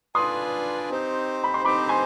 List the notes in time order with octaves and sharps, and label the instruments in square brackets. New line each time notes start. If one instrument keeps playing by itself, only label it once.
[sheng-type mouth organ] D4 F4 B4 D5 G#5 [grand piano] C6 D#6
[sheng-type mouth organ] C4 D#4 G4 C5
[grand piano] B5
C6
[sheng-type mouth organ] C4 D#4 G4 C5 [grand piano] B5 D6
[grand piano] G#5 C6